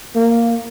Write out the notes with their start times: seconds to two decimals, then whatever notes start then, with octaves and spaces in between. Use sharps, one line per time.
0.16 A#3